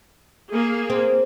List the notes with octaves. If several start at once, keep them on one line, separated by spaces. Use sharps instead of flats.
A#3 G#4
C4